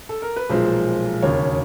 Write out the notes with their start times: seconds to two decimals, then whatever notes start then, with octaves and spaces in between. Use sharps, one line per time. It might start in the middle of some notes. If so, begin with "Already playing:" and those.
0.09 A4
0.22 A#4
0.36 B4
0.50 B1 A#2 F3 G#3 C5
1.23 E1 D#2 C#3 C#5